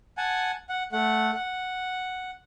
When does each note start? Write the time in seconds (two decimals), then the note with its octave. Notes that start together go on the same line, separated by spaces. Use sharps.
0.18 F#5 G#5 A5
0.69 F#5
0.92 A3 F#5
1.35 F#5